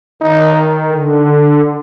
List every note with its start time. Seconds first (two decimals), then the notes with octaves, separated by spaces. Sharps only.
0.21 D#3 D#4
0.90 D3